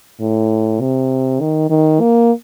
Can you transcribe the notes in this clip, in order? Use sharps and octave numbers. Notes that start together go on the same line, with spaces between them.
A2
C3
D#3
D#3
A#3